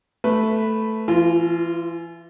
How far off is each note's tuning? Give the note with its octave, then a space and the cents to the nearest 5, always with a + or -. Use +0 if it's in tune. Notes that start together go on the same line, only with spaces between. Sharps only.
A3 +0 B4 +0
E3 +30 F4 -10